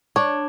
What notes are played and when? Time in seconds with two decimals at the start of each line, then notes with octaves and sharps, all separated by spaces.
0.16 D4 C#5